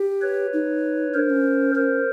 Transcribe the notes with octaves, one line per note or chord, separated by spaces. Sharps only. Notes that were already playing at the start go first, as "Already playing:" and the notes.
Already playing: G4
B4 C#5
D#4
D4 A#4 C5
C#4
A#4 C5